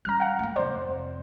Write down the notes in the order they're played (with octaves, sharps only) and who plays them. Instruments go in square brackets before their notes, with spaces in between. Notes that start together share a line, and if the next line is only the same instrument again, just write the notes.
[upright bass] G3 C#4 [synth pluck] A#5 F6
[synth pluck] F5 F#5
[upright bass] A3 A#3
[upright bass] F1 F2 [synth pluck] C5 D5